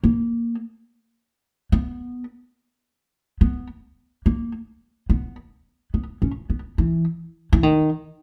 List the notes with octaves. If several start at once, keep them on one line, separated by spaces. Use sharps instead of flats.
A#3
B3
B3
A#3
B3
B3
C#4
B3
E3
E3
D#3